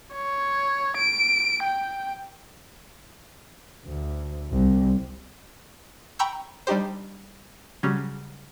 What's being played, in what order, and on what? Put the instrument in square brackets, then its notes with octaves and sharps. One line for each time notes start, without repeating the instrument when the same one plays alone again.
[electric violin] C#5
D7
G5
[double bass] D2
C2
[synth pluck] G5 A#5 B5 C#6 E6 G6
G3 D4 D#4 G4 C5
C#3 F#3 G3 C#4